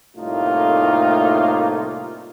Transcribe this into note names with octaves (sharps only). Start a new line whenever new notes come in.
C2 A2 A3 A#3 D#4 F4